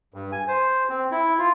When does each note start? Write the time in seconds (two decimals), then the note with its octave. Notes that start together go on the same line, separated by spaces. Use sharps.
0.14 G2
0.32 G#5
0.48 C5
0.90 C4
1.11 E4
1.39 F4